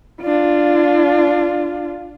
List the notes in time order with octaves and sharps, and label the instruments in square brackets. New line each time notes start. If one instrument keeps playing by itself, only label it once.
[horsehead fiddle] D4 F4